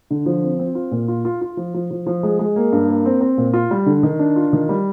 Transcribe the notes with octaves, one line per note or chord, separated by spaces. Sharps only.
D3
F3
C4
C4
F4
A#2
F4
F4
F4
F3
F3
F3
F3
G#3
G#3
A#3
G2
A#3
C4
C4
A#2
F4
G3
D3
D#3
D4
F4
D#3
G3